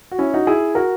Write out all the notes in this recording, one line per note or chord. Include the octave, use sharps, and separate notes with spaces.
F#4
C#4 E4
D#4 F#4
E4 G#4
F#4 A#4